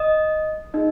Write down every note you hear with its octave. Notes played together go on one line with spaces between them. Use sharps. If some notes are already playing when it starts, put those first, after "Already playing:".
Already playing: D#5 D#6
A#3 D#4 F4 G#4 D#5